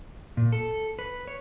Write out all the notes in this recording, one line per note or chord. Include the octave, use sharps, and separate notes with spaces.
A#2
A4
B4
C#5